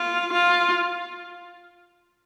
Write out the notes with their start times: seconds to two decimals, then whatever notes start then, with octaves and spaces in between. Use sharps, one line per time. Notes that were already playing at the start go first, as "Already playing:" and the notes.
Already playing: F4
0.33 F4